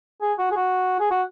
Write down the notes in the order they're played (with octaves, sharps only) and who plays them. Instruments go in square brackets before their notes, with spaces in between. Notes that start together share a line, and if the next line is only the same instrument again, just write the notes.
[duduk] G#4
F#4
G#4
F#4
G#4
F#4